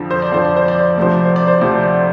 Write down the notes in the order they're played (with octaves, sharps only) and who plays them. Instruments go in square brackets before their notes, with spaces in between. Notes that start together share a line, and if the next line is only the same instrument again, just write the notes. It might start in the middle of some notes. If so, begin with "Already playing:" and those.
Already playing: [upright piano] F2 D3 F3
C5
D5
F2 D3 F3 C5
D5
C5
D5
C5
D5
D2 C3 F3 C5
D5
C5
D5
C5
D2 C3 F3 D5
D5